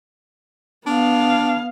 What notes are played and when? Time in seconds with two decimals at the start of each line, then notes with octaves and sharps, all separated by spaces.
0.86 B3 D4 F5